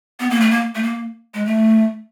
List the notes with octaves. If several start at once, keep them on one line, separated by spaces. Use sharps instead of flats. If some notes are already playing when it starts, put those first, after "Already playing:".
B3
A#3
A3
A#3
A3
A#3
G#3
A3